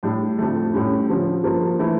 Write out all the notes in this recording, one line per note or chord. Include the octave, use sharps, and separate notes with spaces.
A2 G3 D4
F2 D3 A3
A2 G3 C#4
D3 F3 C#4
G2 F3 A#3
E3 A3 E4